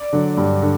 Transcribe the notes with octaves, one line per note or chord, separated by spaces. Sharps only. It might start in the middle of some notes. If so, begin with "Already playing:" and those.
Already playing: D5
D3 F#3
G2
D3